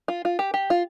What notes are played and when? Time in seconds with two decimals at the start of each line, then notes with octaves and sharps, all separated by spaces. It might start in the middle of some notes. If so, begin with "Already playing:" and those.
0.08 F4
0.25 F4
0.39 G4
0.54 G4
0.70 F4